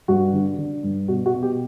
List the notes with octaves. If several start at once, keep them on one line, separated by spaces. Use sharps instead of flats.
G2 F#4
D3
D3
G2
B2 F#4
F#4
B2
G4